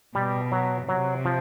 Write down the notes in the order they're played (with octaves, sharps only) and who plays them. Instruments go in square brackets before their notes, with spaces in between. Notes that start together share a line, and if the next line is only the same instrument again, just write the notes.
[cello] B2 [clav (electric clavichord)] G3
[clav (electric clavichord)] F#3
[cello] C3 [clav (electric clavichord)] F#3
[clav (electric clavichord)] F3